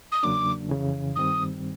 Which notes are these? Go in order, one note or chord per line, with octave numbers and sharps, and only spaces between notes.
D#6
E2 C#3 F#3 A#3 D4 D6
F2 C#3 E3
G2 D#3 G3 C4 D#6